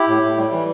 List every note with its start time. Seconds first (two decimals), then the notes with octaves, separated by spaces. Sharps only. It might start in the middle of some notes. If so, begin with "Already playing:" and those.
Already playing: E4 G4
0.08 A2
0.23 A2
0.38 G3
0.53 E3